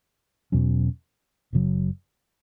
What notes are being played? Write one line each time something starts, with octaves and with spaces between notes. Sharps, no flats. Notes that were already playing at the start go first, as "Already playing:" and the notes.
E2 B2 F#3 C#4
F#1 F#2 C#3 F#3